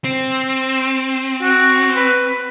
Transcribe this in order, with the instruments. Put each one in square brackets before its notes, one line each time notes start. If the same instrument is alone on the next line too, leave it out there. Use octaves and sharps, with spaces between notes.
[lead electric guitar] C4
[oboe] F#4
B4